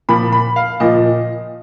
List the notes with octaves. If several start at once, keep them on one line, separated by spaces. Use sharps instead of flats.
A#2 F3 B5
B5
F5
A#2 F3 D#5